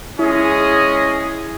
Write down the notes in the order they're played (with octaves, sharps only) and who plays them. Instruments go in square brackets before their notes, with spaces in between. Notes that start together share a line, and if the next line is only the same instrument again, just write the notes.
[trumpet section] G#3 C#4 G#4 D#5 [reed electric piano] E4